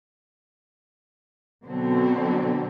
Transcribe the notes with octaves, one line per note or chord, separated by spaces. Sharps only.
B2 D3 F#3 C4